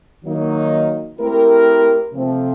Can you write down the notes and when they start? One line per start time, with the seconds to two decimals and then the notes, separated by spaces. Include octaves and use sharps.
0.24 D#3 F#3 A#3 D#4
1.18 A3 C4 E4 G4 A#4
2.12 C3 F3 A3 C4